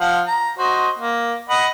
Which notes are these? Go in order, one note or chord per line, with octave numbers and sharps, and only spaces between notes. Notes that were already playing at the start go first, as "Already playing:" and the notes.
F3 F4 F#5
A#5
F#4 C5 D#5
A#3
D#5 F#5 B5